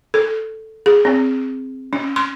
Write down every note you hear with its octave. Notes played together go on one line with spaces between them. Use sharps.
A4
G#4
C4
C#4
C6